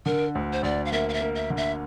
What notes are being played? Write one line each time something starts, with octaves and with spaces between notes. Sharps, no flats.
D3 A#4
D2
C5
D2 D5
F5
A#3 E5
F5
E5
A#3
E5
D3
E5